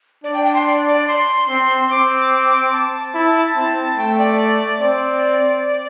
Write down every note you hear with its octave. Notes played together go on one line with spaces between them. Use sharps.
D4 D5
G5
G5
C6
D5
D5
C6
C4
C4 D6
A5
E4
C4
A3 G5
D5
C4 D5